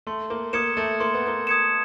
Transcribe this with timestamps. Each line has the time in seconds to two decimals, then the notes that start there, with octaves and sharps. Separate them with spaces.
0.07 A3 C6
0.30 A#3
0.53 A#3 D#6 G#6 C#7 E7
0.77 A3
1.00 A#3 C6
1.14 B3
1.27 A#3
1.47 D#6 G#6 C#7 E7